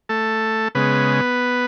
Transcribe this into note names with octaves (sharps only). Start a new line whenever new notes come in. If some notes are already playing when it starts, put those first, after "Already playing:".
A3 A4
C#3 G#3 B3 B4